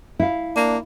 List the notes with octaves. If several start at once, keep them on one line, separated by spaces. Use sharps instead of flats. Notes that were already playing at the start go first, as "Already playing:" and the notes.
E4 F5
A#3 D4